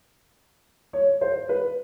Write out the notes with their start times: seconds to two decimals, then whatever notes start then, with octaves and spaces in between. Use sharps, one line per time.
0.93 C#5
1.21 C5
1.49 B4